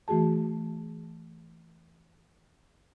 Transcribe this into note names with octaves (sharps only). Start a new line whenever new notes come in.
E3 A3 F#4 G#4 A5